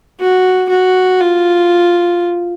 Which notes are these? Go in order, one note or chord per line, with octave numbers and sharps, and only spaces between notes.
F#4
F#4
F4